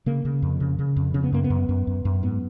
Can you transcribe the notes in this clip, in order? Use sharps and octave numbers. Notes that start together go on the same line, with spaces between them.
C#3 A#3
C#3
F2
C#3
C#3
F2
C#3 C#4
B3
F#2 A#3
B3
F#2
F#2
F#2
F#2
G#2 B3